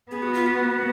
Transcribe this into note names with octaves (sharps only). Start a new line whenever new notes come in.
B3 G#4
F#4
F4
F#4